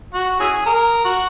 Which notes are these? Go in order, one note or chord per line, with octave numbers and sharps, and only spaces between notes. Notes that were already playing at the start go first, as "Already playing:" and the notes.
F#4
C#4 E4 G#4
A#4
F#4